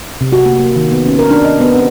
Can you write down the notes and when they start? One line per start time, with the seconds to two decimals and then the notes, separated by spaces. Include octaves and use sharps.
0.21 C3
0.32 F#4
0.46 A#3
0.59 A#3
0.76 D#3
0.91 B3
1.06 C#4
1.19 A#4
1.31 D4
1.45 D#5
1.60 B3
1.76 C4